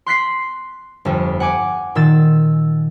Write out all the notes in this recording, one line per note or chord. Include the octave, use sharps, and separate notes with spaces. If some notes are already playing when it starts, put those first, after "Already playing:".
C6 F#6 B6 C7
G1 F2
F#5 G#5 D6
A#2 D#3 E6 A6